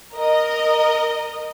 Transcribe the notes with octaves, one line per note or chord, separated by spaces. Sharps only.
A#4 D#5